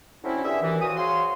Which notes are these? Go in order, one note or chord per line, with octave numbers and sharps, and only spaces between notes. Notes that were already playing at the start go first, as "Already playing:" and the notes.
D3 F#3 A3 C4 C#4 E4
G2 D3 G4 G#4 E5
F#2 E3
A#2 F3 A#3 C4 F#4 D#6
F#4 G#4 C5 C#5 F5 C6